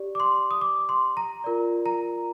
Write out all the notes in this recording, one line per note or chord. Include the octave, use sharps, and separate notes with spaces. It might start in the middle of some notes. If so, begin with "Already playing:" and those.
Already playing: G4 D5
D6
C6
D#6
D6
C6
A#5
F4 A#4 D5
A#5